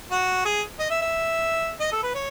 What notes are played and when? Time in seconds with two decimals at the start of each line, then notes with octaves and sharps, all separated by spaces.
0.11 F#4
0.45 G#4
0.79 D#5
0.90 E5
1.02 E5
1.80 D#5
1.92 A4
2.03 B4
2.14 C#5